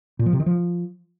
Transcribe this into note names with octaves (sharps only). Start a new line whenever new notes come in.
A#2
F3
C3
D#3
F3